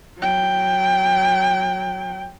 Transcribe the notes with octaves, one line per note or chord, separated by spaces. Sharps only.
F#3 G5